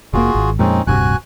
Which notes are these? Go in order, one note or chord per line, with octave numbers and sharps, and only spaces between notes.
F1 A#2 A#3 F4 F#4 G#4
G#1
F2 A#2 G#3 C4 C#4 D#4
D1 G2 C3 F#4 G#5 F#6